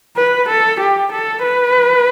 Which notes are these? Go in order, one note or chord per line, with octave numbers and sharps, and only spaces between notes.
B4
A4
G4
A4
B4